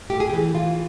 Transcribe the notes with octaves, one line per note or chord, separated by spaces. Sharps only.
A3 G4
G#4
G4
E3
E3 F4